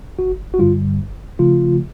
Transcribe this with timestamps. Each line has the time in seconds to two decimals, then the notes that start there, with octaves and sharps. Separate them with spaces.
0.19 G1 F#4
0.54 F#4
0.59 G2 D3 G3 F4
0.98 G1
1.39 C#3 F3 A3 F4